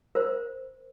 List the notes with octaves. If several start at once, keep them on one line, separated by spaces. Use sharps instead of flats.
A#4 C5